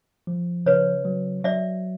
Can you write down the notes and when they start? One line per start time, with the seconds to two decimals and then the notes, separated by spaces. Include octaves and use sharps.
0.27 F3
0.66 C#3 B4 C#5
1.05 F#3
1.44 F#3 D5 E5